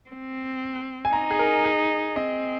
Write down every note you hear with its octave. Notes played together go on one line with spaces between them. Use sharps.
C4
G#5
D#4 A#5
G#4
A#4
G#4
C4 D#5